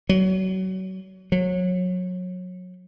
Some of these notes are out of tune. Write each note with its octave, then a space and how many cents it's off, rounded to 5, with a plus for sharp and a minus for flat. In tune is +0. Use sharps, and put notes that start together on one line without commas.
F#3 +25
F#3 -25